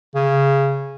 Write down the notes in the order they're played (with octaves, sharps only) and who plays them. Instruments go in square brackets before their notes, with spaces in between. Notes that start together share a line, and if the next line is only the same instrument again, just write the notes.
[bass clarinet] C#3